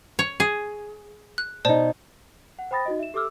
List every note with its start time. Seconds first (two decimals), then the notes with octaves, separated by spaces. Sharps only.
0.19 C#5
0.40 G#4
1.38 F#6
1.65 B2 D#4 C5 D5 A5
2.59 F#5
2.71 C5 G5 B5 D#6 A6 A#6
2.86 D#4 F#4 D#5
2.99 E5 E7
3.14 G4 A4 E5 D6 E6 F6